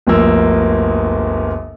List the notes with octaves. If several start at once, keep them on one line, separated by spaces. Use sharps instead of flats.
G1 D2 F3 A#3 E6